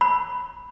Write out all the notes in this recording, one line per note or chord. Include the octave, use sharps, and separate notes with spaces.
B5